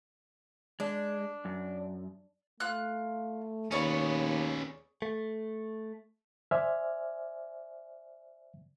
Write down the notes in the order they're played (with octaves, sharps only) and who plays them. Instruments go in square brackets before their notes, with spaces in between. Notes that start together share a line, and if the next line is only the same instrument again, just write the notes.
[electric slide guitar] G#3 [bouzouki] D4
[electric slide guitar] F#2
[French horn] A3 [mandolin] F4 F#6
[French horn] D#2 [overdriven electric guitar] C#4 B4 [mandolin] G#4 C#5 D5
[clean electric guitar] A3
[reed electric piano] C5 D5 E5 G#5 F6